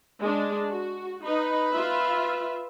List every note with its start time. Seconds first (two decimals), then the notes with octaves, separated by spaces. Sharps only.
0.20 G#3 D4
0.70 F#4
1.24 D#4 B4 B5
1.72 F4 E5